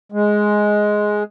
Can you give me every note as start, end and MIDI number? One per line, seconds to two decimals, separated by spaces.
0.12 1.23 56